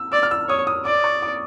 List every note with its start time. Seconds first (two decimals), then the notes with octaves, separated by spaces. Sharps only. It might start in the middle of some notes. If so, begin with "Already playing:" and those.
Already playing: E6
0.12 D5 E6
0.23 F6
0.31 E6
0.49 C#5 D#6
0.67 D#6
0.85 D5 D6
1.04 C#6
1.22 D6